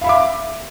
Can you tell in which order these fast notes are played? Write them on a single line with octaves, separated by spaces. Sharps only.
F5 B5 E5 D6